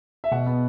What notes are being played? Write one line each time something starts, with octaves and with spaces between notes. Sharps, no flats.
E5
B2 F#5
B3